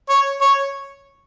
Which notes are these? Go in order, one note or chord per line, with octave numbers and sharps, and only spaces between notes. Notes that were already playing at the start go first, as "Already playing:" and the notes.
C#5
C#5